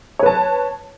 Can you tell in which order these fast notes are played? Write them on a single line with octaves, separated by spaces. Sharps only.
C#5 B4 A5